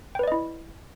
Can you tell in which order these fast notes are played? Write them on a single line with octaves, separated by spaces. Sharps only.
G5 B4 D5 D#5 E4